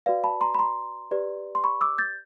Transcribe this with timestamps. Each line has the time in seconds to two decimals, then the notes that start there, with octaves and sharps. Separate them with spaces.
0.06 F#4 B4 D5 F5
0.24 A5 B5
0.41 A#5 C6
0.54 B5
0.59 A#5 C6
1.11 G4 B4 D5
1.55 C6
1.64 B5 C#6
1.81 D6 E6
1.98 G6 A6